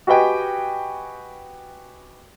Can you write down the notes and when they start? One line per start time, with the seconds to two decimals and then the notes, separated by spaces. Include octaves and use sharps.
0.07 F#4 G4 B4 D#5 G5 G#5